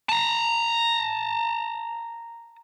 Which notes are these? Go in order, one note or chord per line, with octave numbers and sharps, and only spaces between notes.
A5 A#5